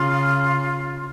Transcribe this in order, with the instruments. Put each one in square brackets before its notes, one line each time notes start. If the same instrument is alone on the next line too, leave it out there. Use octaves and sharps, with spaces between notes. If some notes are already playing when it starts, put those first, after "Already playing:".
Already playing: [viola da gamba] C#3 [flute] F4